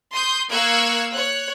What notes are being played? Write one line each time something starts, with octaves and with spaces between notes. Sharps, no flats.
C6 D#6 G6
A#3 F5 C#6 E6 F#6 G#6
C#5 F#6